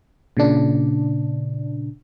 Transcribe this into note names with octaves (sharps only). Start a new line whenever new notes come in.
A#2 C#3 D4